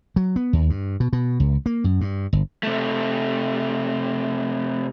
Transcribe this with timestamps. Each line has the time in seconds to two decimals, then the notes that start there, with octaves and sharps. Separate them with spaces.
0.16 F#3
0.36 B3
0.53 D#2
0.70 G2
1.00 B2
1.13 B2
1.40 C#2
1.66 A#3
1.84 F#2
2.01 G2
2.33 G1
2.63 C3 A3